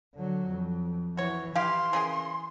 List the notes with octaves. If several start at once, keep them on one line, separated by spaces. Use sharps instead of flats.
D3 F#3
F2
E3 F#4 C#5
E3 E4 G4 F5 C6
C#3 G#4 A#4